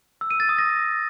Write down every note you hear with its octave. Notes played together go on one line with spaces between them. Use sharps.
E6
D#7
A6
D#6
A#6